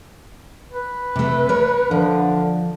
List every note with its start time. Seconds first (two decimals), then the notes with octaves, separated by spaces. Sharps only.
0.72 B4
1.16 C3 A3
1.49 A#4 C#5
1.91 D3 F3